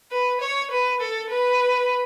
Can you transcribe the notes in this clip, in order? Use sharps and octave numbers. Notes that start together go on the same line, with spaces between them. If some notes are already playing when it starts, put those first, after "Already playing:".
B4
C#5
B4
A4
B4